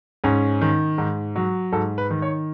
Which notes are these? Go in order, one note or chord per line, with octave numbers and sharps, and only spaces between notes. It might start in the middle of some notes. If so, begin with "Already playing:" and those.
G#2 C#4
D#3
G#2
F#3
G#2 A4
B4
D#3
C#5